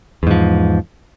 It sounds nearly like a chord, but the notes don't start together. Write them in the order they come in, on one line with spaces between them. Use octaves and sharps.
E2 G#2 F3